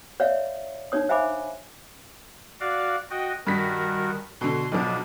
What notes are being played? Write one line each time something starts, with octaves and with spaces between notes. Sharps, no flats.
C#5 D5 E5 F5
D4 D#4 C#5 D#6
C5 E5 F5 G#5 B5 D6
F#4 D5 F5
F#4 D#5 G5
G2 D#3 F#4 A#4 B6
B2 D3 C6
B1 B2 F3 D4